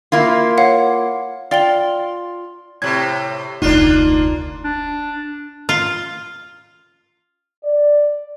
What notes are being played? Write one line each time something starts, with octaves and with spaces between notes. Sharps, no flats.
A#3 E4 F4
C#5 F5 F#5
F4 D5 G5 G7
A2 C3 G#6
F1 D2 A#3 D4 D#4 F4
D4
F4
D5